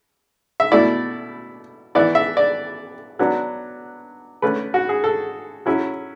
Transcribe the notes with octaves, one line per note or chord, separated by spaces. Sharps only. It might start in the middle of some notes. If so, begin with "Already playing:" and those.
E5
B2 A3 E4 D5
E3 B3 E4 D5
E5
D5
F#3 B3 D4
D3 A3 C#4 B4
F#4
G#4
A4
F#3 C#4 E4